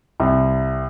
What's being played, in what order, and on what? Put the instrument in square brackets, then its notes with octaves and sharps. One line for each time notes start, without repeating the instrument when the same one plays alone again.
[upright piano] C2